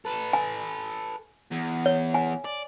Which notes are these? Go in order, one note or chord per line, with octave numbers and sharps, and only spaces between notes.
A4 B4
G#5
E2
C#5
G#5
D5